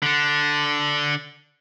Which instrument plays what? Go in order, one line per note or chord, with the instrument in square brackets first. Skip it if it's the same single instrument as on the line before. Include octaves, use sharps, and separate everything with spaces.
[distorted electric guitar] D3 D4